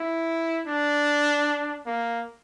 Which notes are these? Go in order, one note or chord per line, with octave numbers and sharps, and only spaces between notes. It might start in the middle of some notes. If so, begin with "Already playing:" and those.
Already playing: E4
D4
A#3